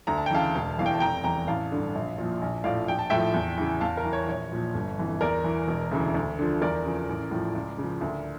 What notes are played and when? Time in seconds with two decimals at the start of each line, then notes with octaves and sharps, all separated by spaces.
0.07 D2 A#5
0.17 A5
0.26 G5
0.31 C#3 E3 F5 A5
0.55 E1
0.78 E2 E3 F5
0.86 G5
0.94 A5
1.00 F1 G5 A#5
1.24 E2 E3 G5 A#5
1.48 A1 F5 A5
1.72 G2 D3
1.95 A#1
2.18 A#2 F3
2.42 A#1
2.64 A2 F3 D5 F5
2.88 A#1 G5
2.99 A5
3.10 A2 F3 E5 G5
3.34 E2
3.58 C#3 E3
3.81 E2 F5 A5
3.97 A#4
4.04 E3
4.13 C#5
4.28 A#1 C#5
4.52 A#2 F3
4.74 G1
4.98 F2 E3
5.21 E2 A#4 D5
5.44 E3
5.68 E1
5.92 D2 C#3 E3
6.15 D2
6.39 D3 F3
6.61 E2 A#4 D5
6.85 C#3 F3
7.09 A1
7.31 A2 F3
7.55 C#2
7.78 C#3 F3
8.01 D2